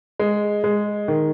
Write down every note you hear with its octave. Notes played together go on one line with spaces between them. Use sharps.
G#3
G#3
D#3